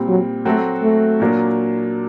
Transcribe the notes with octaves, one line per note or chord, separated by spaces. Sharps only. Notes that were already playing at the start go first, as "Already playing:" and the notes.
Already playing: A#2 G3 C4
F#3
F#3 A3 C4 F#4 A4
A3
A#2 F#3 A#3 D4